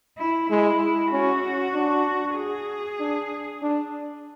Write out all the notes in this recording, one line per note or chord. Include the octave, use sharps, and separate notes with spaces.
E4
G#3 E4
C#4 F#4
D4
G#4
D4
D4